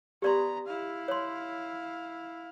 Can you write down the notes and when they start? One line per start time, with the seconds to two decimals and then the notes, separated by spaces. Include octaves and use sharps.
0.22 B3 G4 D5 A#5 C6
0.67 E4 F5
1.08 C#5 C6